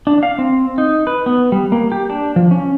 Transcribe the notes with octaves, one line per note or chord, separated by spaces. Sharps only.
D4
F5
C4
D#4
B4
B3
G3
A#3
G4
D4
F3
C#4